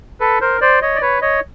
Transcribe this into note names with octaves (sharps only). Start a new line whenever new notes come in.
A4 B4
A#4 C5
C5 D5
C#5 D#5
D5
B4 C#5
C#5 D#5